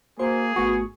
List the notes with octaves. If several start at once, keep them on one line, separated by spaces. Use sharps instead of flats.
A#3 F#4 G#4 C5 C6
G#1 A3 B3 F#4 C#6